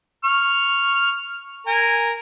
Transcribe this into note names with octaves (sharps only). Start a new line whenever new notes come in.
C#6 F6
A#4 G#5